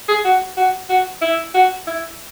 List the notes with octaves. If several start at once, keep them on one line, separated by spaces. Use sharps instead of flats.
G#4
F#4
F#4
F#4
E4
F#4
E4